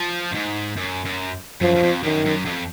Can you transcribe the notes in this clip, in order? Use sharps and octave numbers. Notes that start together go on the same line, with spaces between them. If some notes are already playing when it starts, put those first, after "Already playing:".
Already playing: F3
F#2
G#2
F#2
F#2
F#2 F3
F#2
F2
F#2 D#3
F#2
F2